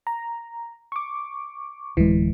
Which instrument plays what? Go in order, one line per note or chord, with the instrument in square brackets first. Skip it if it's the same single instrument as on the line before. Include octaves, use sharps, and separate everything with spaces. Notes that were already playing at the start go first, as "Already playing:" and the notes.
[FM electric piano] A#5
C#6 D6
[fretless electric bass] D1 G#3 [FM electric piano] E3